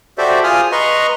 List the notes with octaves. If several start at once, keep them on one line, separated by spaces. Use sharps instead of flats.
F#4 G4 A4 C5 D5 E5
F4 G#4 G#5 D#6 F6
B4 D#5 A#5 C6 C#6